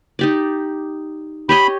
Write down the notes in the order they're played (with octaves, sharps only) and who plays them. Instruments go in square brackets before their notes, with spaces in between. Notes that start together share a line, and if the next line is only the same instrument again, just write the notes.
[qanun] D#4 G4 D5
[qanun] G4 C#5 D#5 [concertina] B5